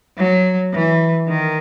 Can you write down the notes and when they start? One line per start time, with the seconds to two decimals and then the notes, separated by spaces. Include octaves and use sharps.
0.17 F#3
0.73 E3
1.29 D#3